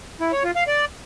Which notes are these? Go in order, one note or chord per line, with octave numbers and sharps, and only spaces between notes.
E4
C#5
F4
F5
D5